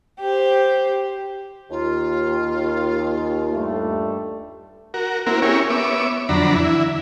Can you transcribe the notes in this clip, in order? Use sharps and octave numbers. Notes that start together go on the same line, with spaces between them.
G4 C5
D#2 F4
G2 G3 A3
F#4 A#4
A#3 C4 E4 F#4 A#4
C#4 E4 G4 G#4 A#4 C#5
B3 C#5 E5 D6
F2 D3 F#3 D4 A#5 B5
E3 E4